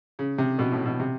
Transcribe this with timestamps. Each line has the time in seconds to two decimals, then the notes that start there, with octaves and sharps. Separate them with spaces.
0.19 C#3
0.38 C3
0.59 B2
0.72 A2
0.86 B2
0.99 C3